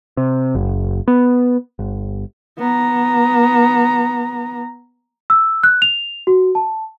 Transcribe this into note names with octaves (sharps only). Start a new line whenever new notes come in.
C3
F#1
B3
G1
B3 A#5
E6
F#6
F7
F#4
A5